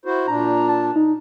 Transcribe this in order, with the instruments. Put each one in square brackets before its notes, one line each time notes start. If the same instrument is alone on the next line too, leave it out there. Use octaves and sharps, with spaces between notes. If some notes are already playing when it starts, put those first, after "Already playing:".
[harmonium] E4 F#4 C5
[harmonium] A#2 D4 [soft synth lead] A#5
[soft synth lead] A5
D#4